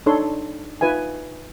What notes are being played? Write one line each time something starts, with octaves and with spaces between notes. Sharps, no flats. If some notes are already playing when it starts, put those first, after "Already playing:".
D4 D#4 A4 C#5 C6
D#4 F4 B4 E5 G#5